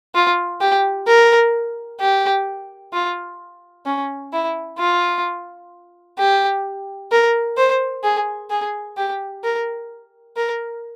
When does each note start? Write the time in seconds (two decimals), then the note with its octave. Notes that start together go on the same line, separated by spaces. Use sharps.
0.15 F4
0.61 G4
1.07 A#4
2.01 G4
2.93 F4
3.86 C#4
4.33 E4
4.79 F4
6.18 G4
7.12 A#4
7.57 C5
8.04 G#4
8.50 G#4
8.97 G4
9.44 A#4
10.37 A#4